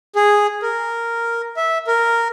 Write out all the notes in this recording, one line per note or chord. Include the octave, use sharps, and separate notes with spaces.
G#4
A#4
E5
A#4